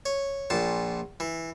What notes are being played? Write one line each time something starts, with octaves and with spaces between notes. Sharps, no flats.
C#5
A#1 A#2 A5
E3